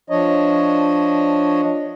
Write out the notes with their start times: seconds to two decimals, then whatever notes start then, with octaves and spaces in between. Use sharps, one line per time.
0.10 F3 D4 C#5 D#5